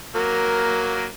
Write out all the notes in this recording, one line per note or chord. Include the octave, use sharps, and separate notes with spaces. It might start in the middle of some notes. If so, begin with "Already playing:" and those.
F#3 A#3 A#4